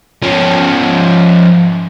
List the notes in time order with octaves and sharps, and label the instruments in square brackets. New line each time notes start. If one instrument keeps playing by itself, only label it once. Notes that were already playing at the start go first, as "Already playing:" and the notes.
[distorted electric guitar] F3 C#4